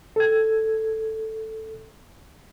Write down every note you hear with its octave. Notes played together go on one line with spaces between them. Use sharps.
A4 G#6